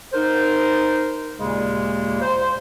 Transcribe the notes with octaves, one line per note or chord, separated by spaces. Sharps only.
D#4 A#4 C5
D#2 A#2 C#3 G#3
C5